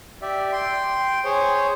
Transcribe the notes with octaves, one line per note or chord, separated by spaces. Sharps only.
G4 D5 E5
G5 C6
G#4 C5 C#5